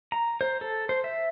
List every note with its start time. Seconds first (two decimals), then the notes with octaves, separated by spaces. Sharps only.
0.12 A#5
0.41 C5
0.61 A4
0.89 C5
1.04 E5